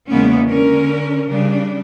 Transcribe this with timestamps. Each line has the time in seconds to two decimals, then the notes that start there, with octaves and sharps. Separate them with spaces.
0.10 E2 C#3 G#3 A#3 B3 C#4
0.48 D3 C#4 A#4
1.29 C#3 G3 D4